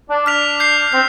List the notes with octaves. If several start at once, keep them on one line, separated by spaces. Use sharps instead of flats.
D4
D4 F6 B6 F7
G6 C7 F7
C4 G6